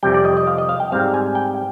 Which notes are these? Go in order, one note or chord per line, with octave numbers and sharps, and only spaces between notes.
F2 C3 G3 G5
D5
D#5
D#5
F5
D#5
F5
G5
G#2 G3 C4 F5
G#5
G5